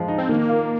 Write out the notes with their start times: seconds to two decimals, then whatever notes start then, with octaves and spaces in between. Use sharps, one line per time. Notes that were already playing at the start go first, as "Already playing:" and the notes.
Already playing: F3 G#3
0.08 D#4
0.18 C4
0.29 D#3 A#3
0.49 F4